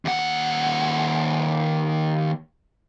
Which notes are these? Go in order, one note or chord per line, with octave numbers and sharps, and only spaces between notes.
D#2 F#5